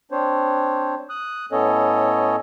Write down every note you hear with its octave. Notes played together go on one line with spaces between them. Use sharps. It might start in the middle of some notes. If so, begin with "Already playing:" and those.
C4 D4 C5 C#5
D#6 F#6
A2 B3 C#4 A4 C#5 D#5